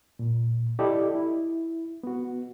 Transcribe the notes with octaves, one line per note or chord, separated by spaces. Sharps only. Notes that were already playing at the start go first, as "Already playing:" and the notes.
A#2
E4 G4 A4 D5 D#5
E4
B3 F#4